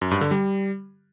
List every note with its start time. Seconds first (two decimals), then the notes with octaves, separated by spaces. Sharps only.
0.02 F#2
0.11 G2
0.21 D3
0.31 G3